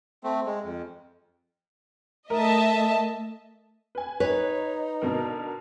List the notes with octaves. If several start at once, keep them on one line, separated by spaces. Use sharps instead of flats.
A3 C4
G#3
F2
A3 A#4 D#5 E5 A5
B4 G#5
D#4 B4 C#5
B2 D3 A#4